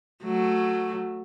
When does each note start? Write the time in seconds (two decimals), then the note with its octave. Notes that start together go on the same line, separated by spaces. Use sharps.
0.24 F#3 A3